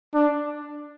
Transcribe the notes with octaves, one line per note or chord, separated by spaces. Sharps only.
D4